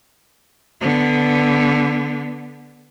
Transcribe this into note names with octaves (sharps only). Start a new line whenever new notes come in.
D3 B3